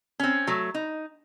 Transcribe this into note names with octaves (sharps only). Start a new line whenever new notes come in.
C4 C#4
F#3 A3
D#4